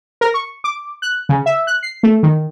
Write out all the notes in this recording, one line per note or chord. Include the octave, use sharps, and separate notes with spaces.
A#4
C#6
D6
F#6
C#3
E5
F#6
C7
A3
D#3